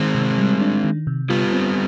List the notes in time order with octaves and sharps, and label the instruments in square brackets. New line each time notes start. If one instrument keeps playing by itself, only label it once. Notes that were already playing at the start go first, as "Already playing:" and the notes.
Already playing: [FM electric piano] D#3 [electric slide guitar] G#3 C4
[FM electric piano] C3
G3
D4
D#3
C3
[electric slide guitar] G3 B3 [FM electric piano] F4
[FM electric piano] C4